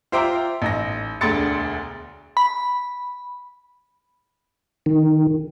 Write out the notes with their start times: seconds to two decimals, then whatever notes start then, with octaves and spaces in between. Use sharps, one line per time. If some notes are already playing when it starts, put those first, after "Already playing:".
0.12 F4 C5 E5 G5 A#5 D6
0.62 A1 D#4 A#6
1.21 E1 D2 D4 C6 A6 C#7
2.37 B5
4.86 D#3